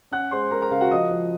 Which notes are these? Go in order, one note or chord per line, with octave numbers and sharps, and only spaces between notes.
C#4 F#5 F#6
G#3 C5 C6
G#3 A#4 A#5
A#4 A#5
C#3 F5
F#4 F#5
F3 D#5 D#6
F3